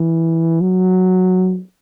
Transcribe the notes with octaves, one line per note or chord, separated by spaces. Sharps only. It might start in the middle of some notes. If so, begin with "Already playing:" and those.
Already playing: E3
F#3